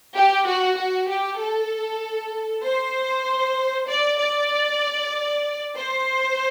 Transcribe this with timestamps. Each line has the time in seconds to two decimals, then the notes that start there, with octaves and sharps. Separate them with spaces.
0.15 G4
0.45 F#4
0.77 F#4
1.08 G4
1.39 A4
2.64 C5
3.89 D5
4.19 D5
5.76 C5